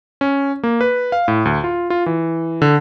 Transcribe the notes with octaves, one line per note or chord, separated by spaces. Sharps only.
C#4
A#3
B4
F5
A2
D2
F4
F4
E3
D3